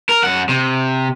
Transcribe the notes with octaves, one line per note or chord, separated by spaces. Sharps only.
A#4
F#2 F#5
C3